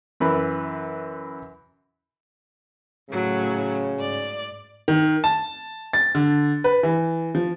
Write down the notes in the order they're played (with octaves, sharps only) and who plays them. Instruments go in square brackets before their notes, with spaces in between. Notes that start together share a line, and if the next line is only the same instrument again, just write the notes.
[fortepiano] F#2 E3 B4
[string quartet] A2 F#3 [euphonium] C#3
[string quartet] G#2 D5
[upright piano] D#3
A5
A6
D3
B4
E3
F3